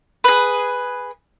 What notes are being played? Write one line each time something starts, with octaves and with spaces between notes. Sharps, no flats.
G#4 B4